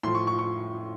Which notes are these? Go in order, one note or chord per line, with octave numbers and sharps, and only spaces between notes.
A2 F3 C6
C#6
C#6
C#6